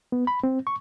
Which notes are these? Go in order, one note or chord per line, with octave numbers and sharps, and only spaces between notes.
B3
B5
C4
C#6